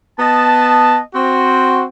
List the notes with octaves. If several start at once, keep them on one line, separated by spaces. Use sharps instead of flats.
B3 D#5 A5
C4 F#4